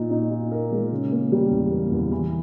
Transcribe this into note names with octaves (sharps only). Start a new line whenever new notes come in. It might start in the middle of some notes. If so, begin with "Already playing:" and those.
Already playing: A#2 D#4
D#4
D#4
A#4
G#3
C#3
A#3
G3
E2
A#3
E2
E3